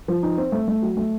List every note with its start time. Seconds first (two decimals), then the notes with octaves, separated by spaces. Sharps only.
0.08 F3
0.23 D#4
0.38 C4
0.52 A3
0.68 A3
0.82 F#3
0.97 A3